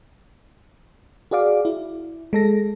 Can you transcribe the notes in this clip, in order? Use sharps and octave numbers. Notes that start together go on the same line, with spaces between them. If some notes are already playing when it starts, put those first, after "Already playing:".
F#4 G#4 D5 F5 D6
E4
G#3 A4 A#6